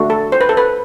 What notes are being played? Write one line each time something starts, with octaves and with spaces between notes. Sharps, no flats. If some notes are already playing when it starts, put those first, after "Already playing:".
Already playing: A3 D4 F#4
A4
C5
B4
A4
B4